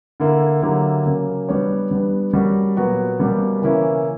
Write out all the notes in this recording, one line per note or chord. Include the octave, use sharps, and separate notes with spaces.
D3 A#3 E4
D3 F#3 A#3 E4 G4
C#3 F#3 A#3
G3 B3 D4 G4 C#5
G3 B3 D4
G3 C#4 F#4 A#4
A#2 F#3 B3 F#4
B2 G3 A#3 C#4 G4
C#3 E3 A#3 C#4 E4